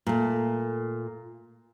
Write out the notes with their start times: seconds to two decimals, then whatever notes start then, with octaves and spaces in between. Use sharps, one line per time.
0.07 A#2 A3